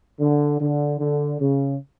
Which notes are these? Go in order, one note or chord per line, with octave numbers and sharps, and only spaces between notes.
D3
D3
D3
C#3